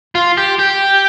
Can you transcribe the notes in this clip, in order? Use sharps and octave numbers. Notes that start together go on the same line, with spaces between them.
F4
G4
G4